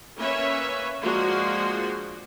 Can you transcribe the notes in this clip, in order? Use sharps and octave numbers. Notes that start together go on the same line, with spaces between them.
A#3 C#4 B4 C#5 E5
F3 G#3 A#3 D4 F#4 C6